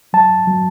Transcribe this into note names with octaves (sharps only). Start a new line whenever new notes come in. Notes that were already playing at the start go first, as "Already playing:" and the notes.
F#3 A5
F#3